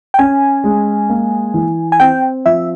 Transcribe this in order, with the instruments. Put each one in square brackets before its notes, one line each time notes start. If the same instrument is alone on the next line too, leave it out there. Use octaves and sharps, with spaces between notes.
[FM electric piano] G5
[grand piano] C#4 [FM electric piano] G#5
[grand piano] G#3
A#3
E3
[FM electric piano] G#5
[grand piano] C4 [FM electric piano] G5
[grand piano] F3 [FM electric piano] E5